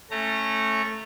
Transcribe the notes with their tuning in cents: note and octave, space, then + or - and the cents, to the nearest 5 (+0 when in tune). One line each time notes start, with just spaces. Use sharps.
A3 +0 C#4 -15 A#5 -20